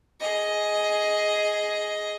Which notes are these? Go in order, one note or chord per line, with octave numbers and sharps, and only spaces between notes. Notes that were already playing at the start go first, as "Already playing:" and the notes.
G#4 D#5